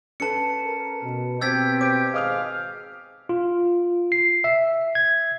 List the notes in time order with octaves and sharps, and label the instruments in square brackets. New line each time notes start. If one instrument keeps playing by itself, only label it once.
[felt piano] C#4 A4 B4 [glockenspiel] A5 C#7
[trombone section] A#4
B2
[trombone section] B2 C4 [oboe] G4 [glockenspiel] E6 G#6 B6 [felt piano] A6
[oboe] G4 [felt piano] C5 D7 [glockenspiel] D6
[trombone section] G#1 G#4 C5 [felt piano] D#5 D#6 F6 [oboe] F5
[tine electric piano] F4
C7
E5
G#6